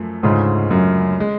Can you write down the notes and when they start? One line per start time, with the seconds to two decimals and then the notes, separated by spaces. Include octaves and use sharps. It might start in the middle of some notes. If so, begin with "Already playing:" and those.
Already playing: F#2 F3 A3
0.23 D2 G#2 C#3 G#3 C#4 F4
0.71 F#2
1.20 G#3